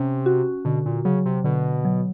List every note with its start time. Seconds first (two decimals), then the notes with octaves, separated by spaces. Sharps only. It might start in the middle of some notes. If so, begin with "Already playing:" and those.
Already playing: C3 C#4
0.26 F#4
0.65 B2 D3
0.86 A#2
1.05 C#3 F#3
1.26 C3
1.44 B2 D3
1.85 F#3